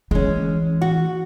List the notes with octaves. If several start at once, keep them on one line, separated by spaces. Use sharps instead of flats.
E3 G#3 C#4
F#4